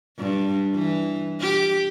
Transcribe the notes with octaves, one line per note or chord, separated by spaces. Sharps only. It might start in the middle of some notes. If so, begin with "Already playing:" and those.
G2
E3
G4